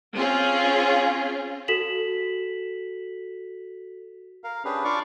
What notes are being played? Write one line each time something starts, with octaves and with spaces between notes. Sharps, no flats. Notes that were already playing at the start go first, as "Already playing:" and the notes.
C4 C#4 F4 G#4
F#4 A4 B6 E7 F#7
A#4 F5
C#4 D4 G4 G#4 B4
D4 F4 D5 F5 C#6 D6